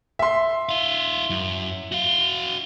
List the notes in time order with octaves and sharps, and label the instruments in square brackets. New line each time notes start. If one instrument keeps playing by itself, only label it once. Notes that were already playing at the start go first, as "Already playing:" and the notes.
[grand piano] E5 C6
[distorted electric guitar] E4 F5
F#2
F#4 F5